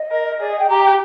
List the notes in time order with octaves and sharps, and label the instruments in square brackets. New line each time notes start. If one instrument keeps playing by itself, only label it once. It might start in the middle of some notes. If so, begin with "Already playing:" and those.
Already playing: [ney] D#5
[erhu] A#4
[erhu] G#4 [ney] D5
[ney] D#5
G5
[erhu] G4 [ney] A#5
[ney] G5